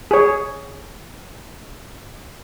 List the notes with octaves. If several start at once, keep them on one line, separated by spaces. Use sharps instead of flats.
G#4 C#5